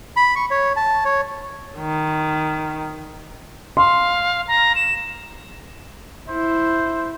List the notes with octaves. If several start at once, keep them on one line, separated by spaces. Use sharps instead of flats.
B5
C#6
C#5
A5
C#5
D#3
F5 C6
A#5
E7
E4 C5